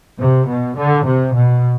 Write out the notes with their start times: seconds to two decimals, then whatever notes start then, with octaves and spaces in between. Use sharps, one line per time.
0.20 C3
0.49 B2
0.77 D3
1.06 C3
1.35 B2